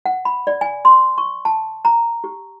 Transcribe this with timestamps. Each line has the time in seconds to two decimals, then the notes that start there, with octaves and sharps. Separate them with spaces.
0.06 F#5
0.25 B5
0.47 D5
0.61 G#5
0.85 C6
1.18 C#6
1.45 A5
1.85 A#5
2.24 G4